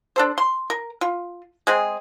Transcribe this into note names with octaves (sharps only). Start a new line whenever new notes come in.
D4 A4 C5
C6
A#4
F4
G#3 C4 G#4